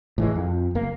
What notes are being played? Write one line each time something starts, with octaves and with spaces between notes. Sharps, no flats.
A2 E3 G#3
F2
F#1 A#3